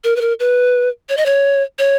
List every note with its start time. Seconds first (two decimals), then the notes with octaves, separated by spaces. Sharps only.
0.04 A#4
0.16 B4
0.21 A#4
0.40 B4
1.09 C#5
1.17 D#5
1.26 C#5
1.79 C#5